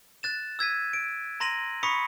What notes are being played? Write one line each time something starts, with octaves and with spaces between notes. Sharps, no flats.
F#6 A6 E7
E6 G#6 B6 D#7
D7
A#5 C6 A#6 D#7 F#7
B5 C#6 D#6 B6 C#7